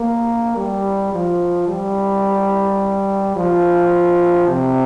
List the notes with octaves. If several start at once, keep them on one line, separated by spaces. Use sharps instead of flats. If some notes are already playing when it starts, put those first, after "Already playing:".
Already playing: A#3
G3
F3
G3
F3
C3